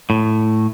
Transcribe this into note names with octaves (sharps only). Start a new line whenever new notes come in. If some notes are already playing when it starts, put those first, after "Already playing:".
A2